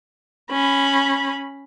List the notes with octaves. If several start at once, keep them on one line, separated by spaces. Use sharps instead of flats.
C#4 B5